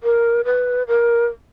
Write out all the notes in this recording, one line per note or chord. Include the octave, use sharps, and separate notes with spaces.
A#4
B4
A#4